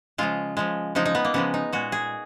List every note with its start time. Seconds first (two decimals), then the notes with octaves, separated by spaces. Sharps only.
0.18 C#3 F3 G#3 F4
0.57 C#3 F3 G#3
0.95 C#3 F3 G#3 D#4
1.05 D#4
1.15 B3
1.25 A#3
1.34 C#3 F3 G#3 B3
1.54 D#4
1.72 A#2 G#3 F#4
1.92 G#4